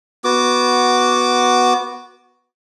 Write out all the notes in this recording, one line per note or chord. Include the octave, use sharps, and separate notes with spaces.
B3 F#4 D6